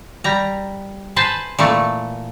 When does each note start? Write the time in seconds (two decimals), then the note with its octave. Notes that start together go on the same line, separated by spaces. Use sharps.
0.24 G3 A#5
1.16 B4 C5 G#5 A5
1.59 A#2 E3 A3